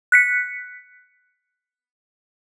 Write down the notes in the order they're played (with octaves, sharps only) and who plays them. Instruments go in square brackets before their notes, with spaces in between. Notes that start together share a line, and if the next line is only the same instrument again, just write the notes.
[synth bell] F#6 B6 C#7